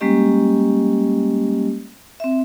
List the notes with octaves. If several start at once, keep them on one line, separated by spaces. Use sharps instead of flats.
G3 G#3 A#3 C#4 G4 D#5
C4 E5